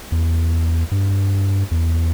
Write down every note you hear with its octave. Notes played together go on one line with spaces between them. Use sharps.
E2
G2
E2